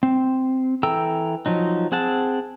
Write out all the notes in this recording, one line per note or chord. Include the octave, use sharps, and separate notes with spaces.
C4
E3 A4 G5 A#5 E6
F3 F#3 D#4
C4 G#4 F#5 A5